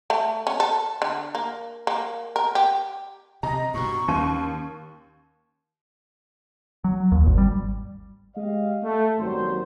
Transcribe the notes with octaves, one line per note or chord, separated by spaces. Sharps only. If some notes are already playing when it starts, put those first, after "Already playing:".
A3
C#4
A4
D3
A#3
A#3
A#4
G4
C3 D#5 A#5
G2 B2 C#6
D#2 C#4 D#7
F#3
D#2
G#1
G3
G#3 G4 D#5 F5
A3
G#1 F#2 F#3 G3 A#3 C5